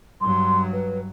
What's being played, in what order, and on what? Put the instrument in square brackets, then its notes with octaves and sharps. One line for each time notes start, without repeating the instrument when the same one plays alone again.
[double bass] G2 F#3 [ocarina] C6
[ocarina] B4